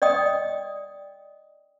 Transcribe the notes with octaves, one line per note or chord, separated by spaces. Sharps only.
D5 D#5 G5 D#6